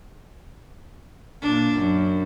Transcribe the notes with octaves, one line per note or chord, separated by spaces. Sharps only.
A#2 D4
F#2